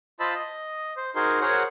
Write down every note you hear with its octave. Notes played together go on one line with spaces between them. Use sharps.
F4 C5 D#5 A5 B5 E6
D#5
C5
D#4 F#4 G#4 A#4 C5 C6
F#4 G#4 A#4 C5 C#5 F#5